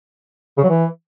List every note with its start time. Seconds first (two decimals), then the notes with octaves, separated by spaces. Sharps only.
0.57 C#3
0.63 F#3
0.69 E3